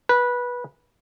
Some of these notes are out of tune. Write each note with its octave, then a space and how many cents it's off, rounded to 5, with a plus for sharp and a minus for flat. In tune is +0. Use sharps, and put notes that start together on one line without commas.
B4 -15